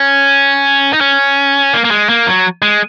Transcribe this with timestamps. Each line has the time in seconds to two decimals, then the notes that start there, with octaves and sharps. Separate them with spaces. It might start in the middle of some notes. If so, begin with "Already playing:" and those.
Already playing: C#4
0.93 D#4
1.01 C#4
1.73 A#3
1.85 A#3
1.91 G#3
2.09 A#3
2.27 F#3
2.62 G#3